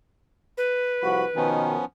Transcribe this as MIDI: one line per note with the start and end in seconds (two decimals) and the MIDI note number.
0.58 1.49 71
1.02 1.23 36
1.02 1.23 53
1.02 1.23 66
1.02 1.26 83
1.36 1.75 47
1.36 1.75 51
1.36 1.85 53
1.36 1.85 59
1.36 1.85 61